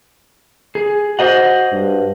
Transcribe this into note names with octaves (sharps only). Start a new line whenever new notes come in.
G#4
F#4 C5 D#5 F#5
G2